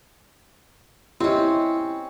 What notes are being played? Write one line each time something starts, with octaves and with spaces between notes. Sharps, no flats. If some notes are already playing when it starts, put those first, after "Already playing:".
C4 C#4 E4 G4 D#5